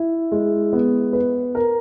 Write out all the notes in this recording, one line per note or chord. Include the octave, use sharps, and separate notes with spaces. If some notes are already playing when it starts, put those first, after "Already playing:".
Already playing: E4
G#3
B3
B4
A#4